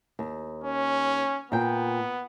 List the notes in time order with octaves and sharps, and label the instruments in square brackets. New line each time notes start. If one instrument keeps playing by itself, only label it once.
[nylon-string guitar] D#2
[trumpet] C#4
[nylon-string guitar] A#2 G5 [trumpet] B3